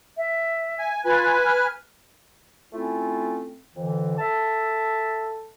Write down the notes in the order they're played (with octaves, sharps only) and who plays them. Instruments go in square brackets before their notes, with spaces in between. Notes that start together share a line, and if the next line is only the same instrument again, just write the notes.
[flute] E5
[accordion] G#5
[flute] F4 [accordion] B4 G#5
[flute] F6
[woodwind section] A3 C4 C#4 E4 F4
F2 D3 E3
A4 E5 A5